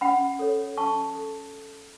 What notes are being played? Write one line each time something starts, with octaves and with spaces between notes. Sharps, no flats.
C#4 F#5 B5
A4 C#5
C#4 A5 C#6
A4